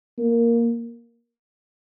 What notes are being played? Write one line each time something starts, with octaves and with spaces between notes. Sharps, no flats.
A#3